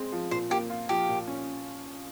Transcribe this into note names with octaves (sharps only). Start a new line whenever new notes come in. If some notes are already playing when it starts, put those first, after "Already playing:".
Already playing: G#3 C4
F3
A#2 C5
A#3 G4
F4
F3 G4
A#2
C#4